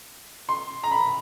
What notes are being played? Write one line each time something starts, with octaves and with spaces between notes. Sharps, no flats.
C6
A#5
B5